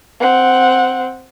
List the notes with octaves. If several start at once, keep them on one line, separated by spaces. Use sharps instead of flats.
C4 F#5